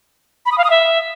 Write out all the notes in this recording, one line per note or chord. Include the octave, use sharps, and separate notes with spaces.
B5
D#6
F5
D#6
E5